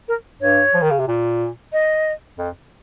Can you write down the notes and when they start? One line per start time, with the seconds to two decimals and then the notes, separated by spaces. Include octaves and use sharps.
0.08 A#4
0.41 G2 C#5
0.74 F3
0.82 D#3
0.91 C#3
0.99 C3
1.08 A#2
1.73 D#5
2.38 F2